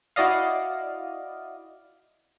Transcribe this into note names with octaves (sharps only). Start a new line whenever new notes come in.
E4 F#4 D5 D#5 F5